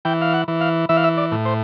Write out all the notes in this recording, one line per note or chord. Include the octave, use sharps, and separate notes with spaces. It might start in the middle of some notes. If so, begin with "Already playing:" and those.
E3 G5
F5
F#5
E3
F5
E3 E5
F5
E5
D5
A2
C5